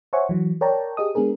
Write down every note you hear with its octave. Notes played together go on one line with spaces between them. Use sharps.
C5 C#5 E5 F#5 G#5 C#6
E3 F#3
A#4 C#5 D5 G5 A5 A#5
G4 G#4 D#5 D#6
G#3 B3 D4 G#4 A#4